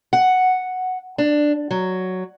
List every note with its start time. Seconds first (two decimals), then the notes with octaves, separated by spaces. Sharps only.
0.13 F#5
1.18 D4
1.71 F#3